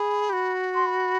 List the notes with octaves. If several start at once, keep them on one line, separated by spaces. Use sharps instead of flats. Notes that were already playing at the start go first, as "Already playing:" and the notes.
Already playing: G#4 B5
G4
F#4
C6
B5